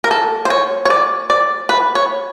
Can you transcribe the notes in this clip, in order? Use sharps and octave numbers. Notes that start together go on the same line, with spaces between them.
A#4
A4
C5
C#5
C#5
D5
D5
B4
C#5